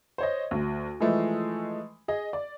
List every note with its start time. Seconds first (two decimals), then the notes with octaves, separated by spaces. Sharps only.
0.18 C5 C#5 D#5
0.51 D2
1.00 E3 F3 G#3 A3
2.08 G#4 D#5
2.33 D5